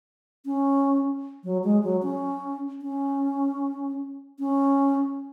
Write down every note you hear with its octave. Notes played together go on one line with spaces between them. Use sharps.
C#4
F#3
G#3
F#3
C#4
C#4
C#4